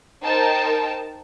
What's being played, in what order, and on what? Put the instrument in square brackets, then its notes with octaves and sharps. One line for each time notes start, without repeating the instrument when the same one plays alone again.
[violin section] D#4 A#4 C5 G5 A5